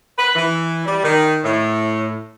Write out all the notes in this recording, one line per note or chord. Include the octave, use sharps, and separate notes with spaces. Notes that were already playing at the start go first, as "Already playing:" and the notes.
B4
E3
G3
D#3
A2